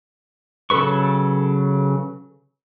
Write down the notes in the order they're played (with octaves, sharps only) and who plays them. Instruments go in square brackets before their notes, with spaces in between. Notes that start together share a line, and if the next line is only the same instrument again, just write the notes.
[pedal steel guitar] C#3 F#3 A4 B4 C#6